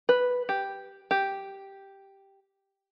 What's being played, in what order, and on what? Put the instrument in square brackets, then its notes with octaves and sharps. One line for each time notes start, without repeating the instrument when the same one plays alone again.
[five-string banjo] B4
G4
G4